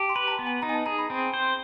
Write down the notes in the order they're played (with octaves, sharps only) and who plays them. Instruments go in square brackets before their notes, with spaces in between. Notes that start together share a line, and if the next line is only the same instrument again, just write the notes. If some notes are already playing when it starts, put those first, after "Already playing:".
Already playing: [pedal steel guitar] G4 [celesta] A5
[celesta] C6
[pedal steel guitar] B4 [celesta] B5
[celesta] A#5
A5
[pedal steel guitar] B3
[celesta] G#5
[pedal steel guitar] D#4 [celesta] A#5
[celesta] G#5
A5
[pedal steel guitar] G#4 [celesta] A#5
[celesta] B5
[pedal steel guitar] C4
C5